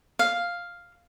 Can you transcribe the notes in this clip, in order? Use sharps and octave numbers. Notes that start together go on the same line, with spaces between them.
F5